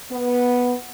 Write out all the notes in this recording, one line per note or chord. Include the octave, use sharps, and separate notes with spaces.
B3